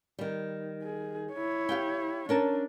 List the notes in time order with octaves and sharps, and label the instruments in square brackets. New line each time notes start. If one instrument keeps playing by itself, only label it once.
[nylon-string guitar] D#3 G3
[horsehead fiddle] G#4
E4 C#5
[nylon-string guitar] G4 F5 G5
[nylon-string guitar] C#4 A#4 A5 [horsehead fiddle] D4